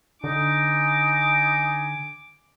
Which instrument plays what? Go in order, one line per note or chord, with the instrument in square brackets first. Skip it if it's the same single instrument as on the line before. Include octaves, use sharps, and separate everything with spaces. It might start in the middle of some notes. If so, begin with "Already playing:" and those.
[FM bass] D3 [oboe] D#4 [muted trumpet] G#5 [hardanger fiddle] D6